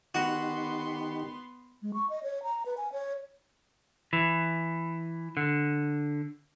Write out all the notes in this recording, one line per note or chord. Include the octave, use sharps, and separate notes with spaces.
D#3 B3 D#4 F#4 G4 C6
G#3
C#6
D#5
C#5
A#5
B4
G#5
C#5
E3
D3